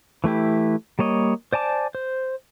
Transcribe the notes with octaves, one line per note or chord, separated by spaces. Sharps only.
E3 A3 E4 G4
G3 A#3 C#5 D#5
C5 D5 G#5 A5 D6
C5